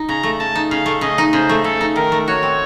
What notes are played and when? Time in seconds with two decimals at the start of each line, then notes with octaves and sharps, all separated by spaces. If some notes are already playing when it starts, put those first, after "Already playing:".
Already playing: D#4
0.09 C#3 A#5
0.23 A3
0.39 C#3 A5
0.55 D#4
0.70 C#3 F5
0.86 A3
1.01 C#3 D#5
1.18 D#4
1.33 C#3 C5
1.49 A3
1.64 C#3 A4
1.81 D#4
1.96 D#3 A#4
2.12 A3
2.28 F#4 C#5
2.43 C4